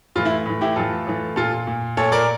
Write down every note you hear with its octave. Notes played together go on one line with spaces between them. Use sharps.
A2 E3 F4
E4
A2 E3
E4 G4
A2 E3 F4 A4
A2 E3
A#2 F4 A4
A#2
A#2 A4 C#5
A#4 D5